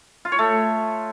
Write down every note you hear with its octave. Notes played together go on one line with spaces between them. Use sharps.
F4
C#5
A3